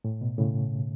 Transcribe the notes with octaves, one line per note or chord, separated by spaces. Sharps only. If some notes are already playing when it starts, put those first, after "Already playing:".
A2
B2
A2 C#3